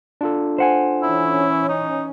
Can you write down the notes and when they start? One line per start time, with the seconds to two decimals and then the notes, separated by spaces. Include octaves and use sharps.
0.21 D4 F4 A4
0.58 C5 F#5 G#5
1.03 E3 C#4 E4
1.69 D#4